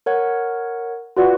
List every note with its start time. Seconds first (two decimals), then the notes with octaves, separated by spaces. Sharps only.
0.06 A#4 C#5 F#5
1.17 F4 F#4 B4 D5